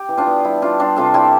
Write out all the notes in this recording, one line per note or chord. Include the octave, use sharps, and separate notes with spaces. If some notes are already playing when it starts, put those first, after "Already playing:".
Already playing: G4
E3
D4 F4
B3
G3 E4
G3 D4 F4
G3 D4 F4
C3 F4 A4
G3 E4 G4